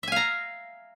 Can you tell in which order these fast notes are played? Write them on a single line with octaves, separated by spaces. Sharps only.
E5 G#5 F5 A#5